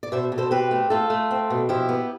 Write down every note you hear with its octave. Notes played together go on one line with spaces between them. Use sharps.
D5
B2 C5 E5
B2
A4 C5
C4 G4 B4
A3
A3 F4 A4
A3
C4
B2
F3 E4 G4
B3